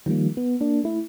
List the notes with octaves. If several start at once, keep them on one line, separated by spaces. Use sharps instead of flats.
D#3 F3 G3 A#3
B3
A#3 D4
A3 E4